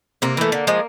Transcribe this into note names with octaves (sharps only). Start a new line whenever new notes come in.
C3 A#3
E3 A3
D3
F3 G#3